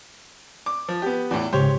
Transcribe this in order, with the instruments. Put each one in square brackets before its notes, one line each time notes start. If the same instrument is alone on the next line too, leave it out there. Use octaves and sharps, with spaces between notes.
[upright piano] D6
F3
B3 G4
E2 A2
[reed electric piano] C#2 G#2 C#3 [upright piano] G4 C5 C#5